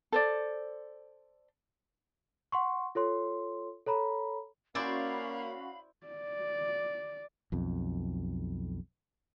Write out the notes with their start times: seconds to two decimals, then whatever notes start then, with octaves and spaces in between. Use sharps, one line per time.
0.12 A4 C5 D5
2.52 F#5 C6 C#6
2.95 F4 A4 C#5 C6
3.86 A4 C#5 A#5 B5
4.75 A#3 C#4 E4 F#4 C5 D5 F5 B5
6.06 D5
7.52 B1 F2